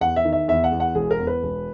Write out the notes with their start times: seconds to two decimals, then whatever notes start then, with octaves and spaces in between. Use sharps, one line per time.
0.01 E2 F#5
0.16 E5
0.25 D#3
0.33 E5
0.48 E2 E5
0.64 F#5
0.72 E2
0.80 F#5
0.95 E1 G#4
1.11 A#4
1.18 E2
1.27 B4
1.43 E1